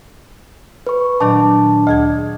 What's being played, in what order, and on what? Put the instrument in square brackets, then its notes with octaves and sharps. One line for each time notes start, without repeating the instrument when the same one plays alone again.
[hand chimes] B4 C#6
[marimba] A#2 D#3 F#3 [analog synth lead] D4 [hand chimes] A5 D6
[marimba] D2 G#4 G#6 [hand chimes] D#5